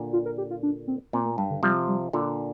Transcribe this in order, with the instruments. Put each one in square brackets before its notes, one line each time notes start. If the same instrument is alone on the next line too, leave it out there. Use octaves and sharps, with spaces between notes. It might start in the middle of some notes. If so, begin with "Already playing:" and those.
Already playing: [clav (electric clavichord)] A#2 D3
[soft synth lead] F4
A#4
G4
F4
D4
C4
[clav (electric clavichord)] A#2 [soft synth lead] C4
[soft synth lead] A#3
[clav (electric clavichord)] G2 [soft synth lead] G3
[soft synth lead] D3
[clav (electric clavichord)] C3 F3 [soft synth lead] G3
[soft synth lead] G3
[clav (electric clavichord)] A#2 D3 [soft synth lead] F4